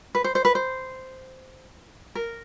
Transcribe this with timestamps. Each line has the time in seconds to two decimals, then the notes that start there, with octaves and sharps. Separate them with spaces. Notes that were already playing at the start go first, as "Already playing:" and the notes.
0.15 B4
0.24 C5
0.35 C5
0.45 B4
0.55 C5
2.15 A#4